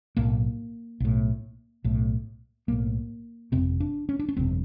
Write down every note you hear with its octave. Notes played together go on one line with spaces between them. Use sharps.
B1 A2 A#3
B1 A2
B1 A2
B1 A2 A#3
G1 F2 C3 C4
D4
C#4
D4
C#4
G1 F2 C3 C4